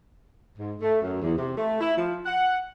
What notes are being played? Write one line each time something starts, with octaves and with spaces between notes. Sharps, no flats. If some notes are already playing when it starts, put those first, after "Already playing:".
G#2
A3
F#2
E2
C3
A3
E4
F3
F#5